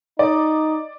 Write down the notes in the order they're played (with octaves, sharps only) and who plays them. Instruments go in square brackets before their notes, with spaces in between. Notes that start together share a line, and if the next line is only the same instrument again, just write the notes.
[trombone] D#4 [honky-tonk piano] D5